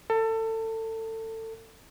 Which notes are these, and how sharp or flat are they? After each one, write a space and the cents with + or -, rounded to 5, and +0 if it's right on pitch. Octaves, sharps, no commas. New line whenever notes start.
A4 +25